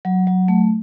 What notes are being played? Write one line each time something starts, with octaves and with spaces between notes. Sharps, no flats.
F#3
F#3
A3